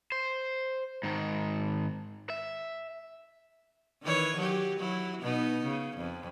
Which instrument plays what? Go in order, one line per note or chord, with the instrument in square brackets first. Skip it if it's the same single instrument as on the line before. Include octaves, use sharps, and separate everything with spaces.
[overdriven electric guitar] C5
G#2 D#3
E5
[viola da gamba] D#3 E3 C#5
F#3 G4
F#3 E4
B2 B3 D#4
C#3
F2